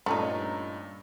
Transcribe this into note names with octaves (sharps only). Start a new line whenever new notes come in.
G2 A#2 A3 C#4 D#4